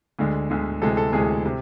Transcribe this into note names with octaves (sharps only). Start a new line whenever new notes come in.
D2 D3 G#3
D2 D3 G#3
D2 C3 E3 G#3 A4
A4
D2 C3 E3 G#3 G#4
C3